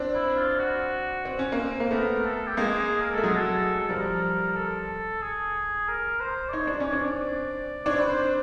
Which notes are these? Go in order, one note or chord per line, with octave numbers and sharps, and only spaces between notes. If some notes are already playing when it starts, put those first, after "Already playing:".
Already playing: C4 D4
E4
F4
F#4
C4
C#4
A#3 C4
A#3
A3 B3 A#4
A4
G4
G#3 A#3 G#4
G#4
A#4
A3 A4
F#3 G#3 G#4
A4
A4
F3 G3 A#4
A4
G#4
A#4
C5
D5
D#4 C#5
D4
C#4 D5
C#5
C4 D4
D5
C4 D4 C#5
B4
C5